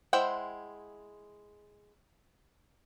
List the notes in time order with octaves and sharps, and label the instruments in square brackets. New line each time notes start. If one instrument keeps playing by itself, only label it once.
[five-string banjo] G#3 E4 C5 F#5 G5